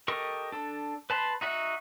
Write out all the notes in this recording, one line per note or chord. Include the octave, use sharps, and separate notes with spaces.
G4 A4 A#4 D#5 C#6
D4 A4
B4 A5 B5 C6
D#4 F#4 E5 F#5